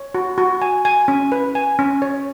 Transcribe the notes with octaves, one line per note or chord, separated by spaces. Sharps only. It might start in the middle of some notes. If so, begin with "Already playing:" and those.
Already playing: C#5
F#4
F#4
G#5
G#5
C#4
B4
G#5
C#4
C#5